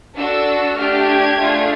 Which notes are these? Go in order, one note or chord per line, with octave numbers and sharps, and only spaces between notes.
D4 F#4 A4 E6
A3 D4 G4 F6
G#6
A3 D4 F4 G#4